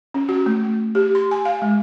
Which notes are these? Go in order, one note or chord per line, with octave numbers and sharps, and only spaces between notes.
C#4
F#4
A3
G4
C6
G#5
F5
G#3